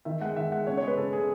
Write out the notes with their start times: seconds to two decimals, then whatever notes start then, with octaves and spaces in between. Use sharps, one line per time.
0.05 D#3 E5
0.21 G#3 F#5
0.36 D#3 E5
0.52 G#3 F#5
0.67 C#3 C#5
0.77 G#3 C#5
0.87 B4
0.97 C#3 A4
1.13 G#3 G#4